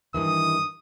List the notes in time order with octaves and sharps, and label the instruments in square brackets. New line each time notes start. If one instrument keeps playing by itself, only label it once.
[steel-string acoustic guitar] G2 D#3 E3 [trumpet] D#6